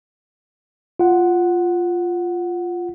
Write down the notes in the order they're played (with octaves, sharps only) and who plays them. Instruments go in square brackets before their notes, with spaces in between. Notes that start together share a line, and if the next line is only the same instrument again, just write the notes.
[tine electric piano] F4 F#5